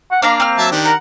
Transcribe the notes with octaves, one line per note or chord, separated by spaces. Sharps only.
F#5
A#3 D4 F5 A#5
C4 F6
F#3 E5 A5
D#3 D4 G4
A#4 F#5